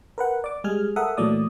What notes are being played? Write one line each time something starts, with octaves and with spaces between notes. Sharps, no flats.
A#4 B4 F#5
D5 D6
G3 G#3 G#4 G#5 F6
A4 A#4 E5 F#5 D#6
A#2 E3 F#3 A3 D5 D#6